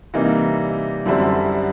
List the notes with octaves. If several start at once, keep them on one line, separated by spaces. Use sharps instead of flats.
C3 E3 G3 A#3 D#4
F#2 D3 G3 C4 E4